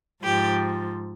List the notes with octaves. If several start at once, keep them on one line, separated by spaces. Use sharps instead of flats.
G#2 F3 G4